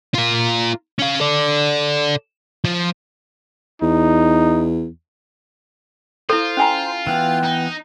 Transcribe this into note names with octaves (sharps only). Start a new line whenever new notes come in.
F4 A#4
C#4 F5
A4 D5
F3
E2 D#4
E4 F4 A4 C5
C#4 G#5 A#5
E3 B3 G5
D#4